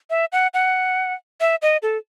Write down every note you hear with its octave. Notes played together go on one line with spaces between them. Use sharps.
E5
F#5
F#5
E5
D#5
A4